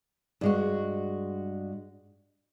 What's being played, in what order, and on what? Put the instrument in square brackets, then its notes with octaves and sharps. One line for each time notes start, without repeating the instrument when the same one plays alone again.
[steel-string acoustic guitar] G2 G#3 F#4